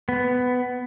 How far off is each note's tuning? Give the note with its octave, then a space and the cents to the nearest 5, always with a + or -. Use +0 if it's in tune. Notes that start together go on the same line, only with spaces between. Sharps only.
B3 +15